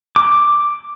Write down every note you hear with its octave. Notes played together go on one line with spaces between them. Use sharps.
D6